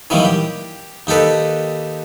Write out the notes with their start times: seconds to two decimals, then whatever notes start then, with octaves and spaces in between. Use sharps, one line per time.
0.10 D#3 E3 F#3 G3 A#3
0.25 G4
1.07 D#2 D#4 G4 A4 B4